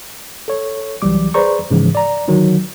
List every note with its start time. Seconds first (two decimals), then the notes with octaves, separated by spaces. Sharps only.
0.48 A4 C#5
1.02 C2 E3 F#3 G3 D6
1.34 G#4 B4 C5 D5 A#5 C#6
1.71 G#2 C#3 E3 F3 G#3
1.95 D5 A#5
2.28 D3 D#3 F#3